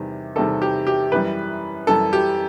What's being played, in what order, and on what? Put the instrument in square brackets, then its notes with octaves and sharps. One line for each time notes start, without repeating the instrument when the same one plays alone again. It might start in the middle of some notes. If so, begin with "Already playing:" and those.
Already playing: [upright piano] E2 C3 D#3 G3
[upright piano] E2 C3 D#3 G3 [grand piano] A4
[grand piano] G4
G4
[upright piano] F#2 E3 G3 [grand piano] B4
[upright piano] F#2 E3 G3 [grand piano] A4
[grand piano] G4